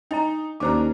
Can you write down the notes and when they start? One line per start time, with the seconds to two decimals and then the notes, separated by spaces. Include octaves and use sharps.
0.11 D4 D#4 D#5 A#5
0.60 D#2 C#4 D4 C5 A#5 D6